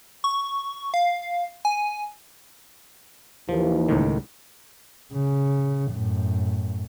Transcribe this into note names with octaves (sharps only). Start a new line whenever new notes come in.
C#6
F5
G#5
D#2 E3 F3
C#2 A2 D#3
C#3
F#2 A2